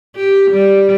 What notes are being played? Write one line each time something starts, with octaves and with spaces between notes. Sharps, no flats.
G4
G3